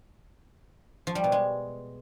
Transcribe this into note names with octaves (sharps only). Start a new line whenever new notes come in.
F3
G3
B2
G#3